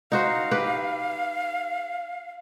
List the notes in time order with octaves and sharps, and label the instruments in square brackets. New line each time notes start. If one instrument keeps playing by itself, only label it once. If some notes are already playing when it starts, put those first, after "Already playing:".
[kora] D#4 F#4 C5 [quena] F5
[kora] G4 B4